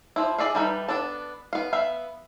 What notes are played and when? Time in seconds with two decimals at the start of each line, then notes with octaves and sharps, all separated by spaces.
0.16 F3 E4
0.38 G#4 D5 E5 F5
0.55 E3 G3 D#4 A4 B4
0.88 B3 D4 A4 A5
1.53 B3 F5
1.73 B3 E5 F5